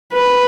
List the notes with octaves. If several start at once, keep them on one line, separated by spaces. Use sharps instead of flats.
B4